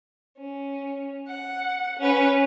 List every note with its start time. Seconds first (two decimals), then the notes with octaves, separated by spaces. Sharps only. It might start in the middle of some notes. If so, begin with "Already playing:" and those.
0.37 C#4
1.27 F#5
1.99 C#4 B4